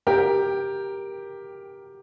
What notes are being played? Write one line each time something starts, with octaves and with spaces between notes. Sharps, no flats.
G4 A#4